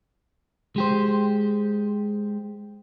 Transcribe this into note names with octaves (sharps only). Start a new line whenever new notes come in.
G#3 G4 C5